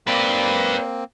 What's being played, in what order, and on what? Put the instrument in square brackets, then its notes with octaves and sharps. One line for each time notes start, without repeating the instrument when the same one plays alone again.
[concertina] A#3 C4 [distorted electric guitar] B4 D5